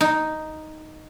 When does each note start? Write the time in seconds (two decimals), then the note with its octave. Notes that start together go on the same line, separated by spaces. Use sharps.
0.01 D#4